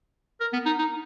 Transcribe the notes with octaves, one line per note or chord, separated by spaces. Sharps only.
A#4
B3
D#4
D#4